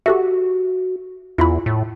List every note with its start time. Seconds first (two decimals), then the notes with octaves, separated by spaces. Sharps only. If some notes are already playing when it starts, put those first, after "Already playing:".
0.06 F#4 G4 A4 E5
1.38 E2 E4 F4 B5
1.66 A2